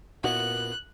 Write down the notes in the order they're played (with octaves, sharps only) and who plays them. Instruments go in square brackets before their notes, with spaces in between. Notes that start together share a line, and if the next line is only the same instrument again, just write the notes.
[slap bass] A#2 [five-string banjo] B3 E4 F#4 [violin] F#6